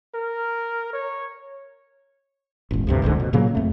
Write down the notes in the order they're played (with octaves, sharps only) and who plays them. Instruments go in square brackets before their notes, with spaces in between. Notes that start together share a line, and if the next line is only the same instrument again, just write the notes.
[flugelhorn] A#4
C#5
[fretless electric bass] E1 A1
D2 G2 C3
F1 C#2 G#2 D3
B2
A#2 C#3 F#3 A#3
F2 A3